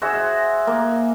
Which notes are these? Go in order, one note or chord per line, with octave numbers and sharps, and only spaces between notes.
F#4 G#4 C5 E5
F#5
A#3